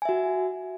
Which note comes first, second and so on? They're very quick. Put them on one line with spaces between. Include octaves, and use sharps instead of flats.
G#5 E5 F#4